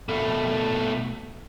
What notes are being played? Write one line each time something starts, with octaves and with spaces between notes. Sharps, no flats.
B2 A3